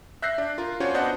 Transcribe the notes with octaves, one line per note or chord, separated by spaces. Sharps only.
E5 F#6 G6 A#6 C7
D4
F4 A#4
C#4 D4 F4 F#4 C5 C#5
B3 D4 C5 D#5 F#5 A5